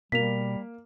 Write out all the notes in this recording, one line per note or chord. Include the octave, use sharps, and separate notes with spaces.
B2 G3 A#3 B6 F7